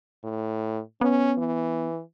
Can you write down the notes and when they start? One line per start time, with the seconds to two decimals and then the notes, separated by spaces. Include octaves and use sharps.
0.24 A2
1.01 B3 C#4
1.38 E3